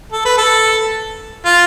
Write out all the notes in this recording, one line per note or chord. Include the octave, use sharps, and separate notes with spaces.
A4
B4
A4
F4